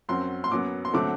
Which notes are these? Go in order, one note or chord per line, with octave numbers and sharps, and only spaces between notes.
F#2 F#3 C4 C6
C6
F#2 F#3 B3 D6
C6
D3 F#3 A3 C4 D6